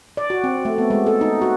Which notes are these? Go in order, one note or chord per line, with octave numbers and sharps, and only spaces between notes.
D5
F#4
C4
A3
B3
G#3
A4
D#4
F#4